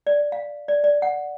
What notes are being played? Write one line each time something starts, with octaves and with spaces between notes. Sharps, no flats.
D5
F5
D5
D5
F#5